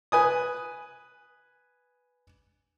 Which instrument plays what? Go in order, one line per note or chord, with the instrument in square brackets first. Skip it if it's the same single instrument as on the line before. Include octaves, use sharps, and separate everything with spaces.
[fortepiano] B4 G#5 D#6